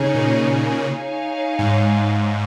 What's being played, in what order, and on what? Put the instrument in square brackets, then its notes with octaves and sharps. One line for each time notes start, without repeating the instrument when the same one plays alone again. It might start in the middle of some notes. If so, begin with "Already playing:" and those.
Already playing: [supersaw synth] C#3 [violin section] D#4 G#4 C#5 G#5
[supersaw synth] A#2
[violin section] D#4 G#4 C#5 F5 G#5
[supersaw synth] G#2